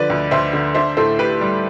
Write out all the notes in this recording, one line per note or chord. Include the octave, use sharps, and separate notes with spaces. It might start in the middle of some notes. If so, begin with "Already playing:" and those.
Already playing: D3 F3 B4 D5
D2
D2 C5 E5
D3
D4 C5 E5
A2 A4 C5
A2 G4 B4
G3